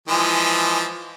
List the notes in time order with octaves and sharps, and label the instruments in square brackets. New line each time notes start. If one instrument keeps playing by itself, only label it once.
[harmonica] E3 F3 G#3